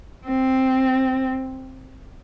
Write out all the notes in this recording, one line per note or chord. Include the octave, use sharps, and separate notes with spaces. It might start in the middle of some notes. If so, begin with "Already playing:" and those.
C4